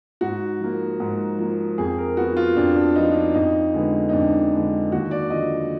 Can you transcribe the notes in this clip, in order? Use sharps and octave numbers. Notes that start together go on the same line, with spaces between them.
G#2 F#4
F3 A#3
G#2
F3 A#3
F2 G#4
A#4
F3 B3 F#4
F4
F2 D4
D4
F3 B3 D#4
D4
F2 D#4
D3 G#3 B3
D#4
F2 D4
D3 G#3 B3
D#2 F#4
D5
D3 F3 D#5